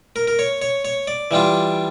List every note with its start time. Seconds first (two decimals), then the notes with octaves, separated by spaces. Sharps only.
0.16 A#4
0.27 A#4
0.39 C#5
0.62 C#5
0.85 C#5
1.07 D5
1.31 E3 G3 D4 F4